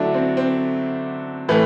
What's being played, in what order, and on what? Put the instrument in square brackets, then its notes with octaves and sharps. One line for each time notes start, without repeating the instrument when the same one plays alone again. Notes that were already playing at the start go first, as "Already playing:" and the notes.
Already playing: [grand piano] D3 F#3 A3 D4 E4
C4
C4
A2 E3 A3